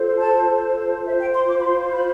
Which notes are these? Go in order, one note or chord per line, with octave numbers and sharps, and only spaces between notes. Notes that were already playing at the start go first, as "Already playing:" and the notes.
Already playing: F4 A4 C5
A5
F4 C5 E5
G5
C6
D6
B5
C6
B5